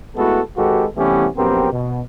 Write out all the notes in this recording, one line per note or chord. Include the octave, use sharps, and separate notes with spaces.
G#3 A3 B3 E4 F#4 A4
G#1 G#3 F#4 G4 A4 B4
C2 E3 A3 B3 C#4 G4
A#1 F#2 B3 C4 G4 A#4
B2